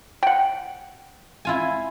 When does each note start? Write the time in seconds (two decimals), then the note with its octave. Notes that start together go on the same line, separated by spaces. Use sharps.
0.23 F#5 G5
1.45 E4 F4 G#5